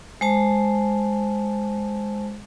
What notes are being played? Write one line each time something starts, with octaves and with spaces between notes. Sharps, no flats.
G#3 C5 A5